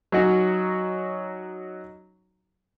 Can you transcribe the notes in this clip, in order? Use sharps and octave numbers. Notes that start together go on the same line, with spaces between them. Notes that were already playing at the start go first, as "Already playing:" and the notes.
F#3 C#4 D#4 F#4